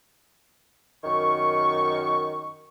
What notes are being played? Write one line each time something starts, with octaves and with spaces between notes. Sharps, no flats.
F#2 D#3 C#6